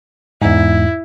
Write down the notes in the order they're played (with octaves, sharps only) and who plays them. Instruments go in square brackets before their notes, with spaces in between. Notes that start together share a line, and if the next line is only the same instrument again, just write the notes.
[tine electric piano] E2 G#2 [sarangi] E4